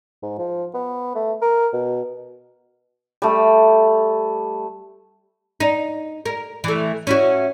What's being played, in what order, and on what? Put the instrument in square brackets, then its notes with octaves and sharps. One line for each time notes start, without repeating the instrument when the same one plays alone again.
[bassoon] G#2
F3
B3
A3
A#4
B2
[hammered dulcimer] G3 A3
[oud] D#4
A#4
E3 A3
C#4 E4 F#4